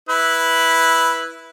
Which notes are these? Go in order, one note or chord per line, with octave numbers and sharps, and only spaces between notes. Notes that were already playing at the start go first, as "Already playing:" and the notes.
E4 B4